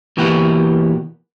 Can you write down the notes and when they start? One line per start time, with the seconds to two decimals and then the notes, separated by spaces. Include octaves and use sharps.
0.17 B2 E3 A#3 G4 B4 F#5